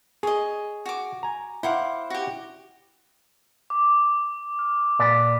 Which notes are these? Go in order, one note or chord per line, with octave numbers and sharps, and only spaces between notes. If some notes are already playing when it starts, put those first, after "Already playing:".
G#4 C#5 D#5
F#4 D6
G#5 A#5
E4 C5 F5 F#5 D6
F#4 G4
D6
F6
A#2 B4 D5